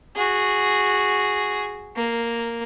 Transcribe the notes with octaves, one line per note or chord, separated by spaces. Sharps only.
F#4 G#4
A#3